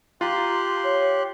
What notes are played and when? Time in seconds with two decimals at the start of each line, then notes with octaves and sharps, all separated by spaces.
0.21 F4 G4 A#5 C6 F#6
0.83 C#5